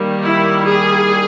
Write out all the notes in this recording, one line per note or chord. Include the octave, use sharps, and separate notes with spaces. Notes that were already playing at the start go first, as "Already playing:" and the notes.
Already playing: D#3 G3 A#3
E4
G#4